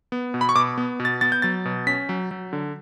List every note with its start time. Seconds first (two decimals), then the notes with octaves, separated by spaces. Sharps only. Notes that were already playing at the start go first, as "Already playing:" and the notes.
0.12 B3
0.34 B2
0.41 B5
0.49 C#6
0.55 B2 D6
0.78 B3
1.00 B2
1.05 A6
1.21 B3 A6
1.32 G6
1.42 F#3 A6
1.65 B2
1.87 C#4 B6
2.09 F#3
2.31 F#3
2.53 D3